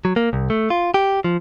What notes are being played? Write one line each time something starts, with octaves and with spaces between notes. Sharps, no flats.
F#3
A#3
C2
A3
F4
G4
F3